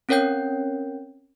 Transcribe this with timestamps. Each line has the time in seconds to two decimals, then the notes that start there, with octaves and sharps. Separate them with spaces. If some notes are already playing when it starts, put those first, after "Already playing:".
0.09 C4 C#4 A#4 C#5 G5 G6